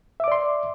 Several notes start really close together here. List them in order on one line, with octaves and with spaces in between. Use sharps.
E5 D6 D5 C6